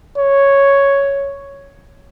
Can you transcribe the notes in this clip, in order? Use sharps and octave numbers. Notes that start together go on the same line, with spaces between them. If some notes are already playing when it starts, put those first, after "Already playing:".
C#5